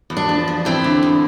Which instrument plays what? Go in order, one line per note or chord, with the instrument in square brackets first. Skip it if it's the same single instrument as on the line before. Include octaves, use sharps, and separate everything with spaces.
[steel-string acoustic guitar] E2
D4
F3
E2
E2 C4 E4
D3
E2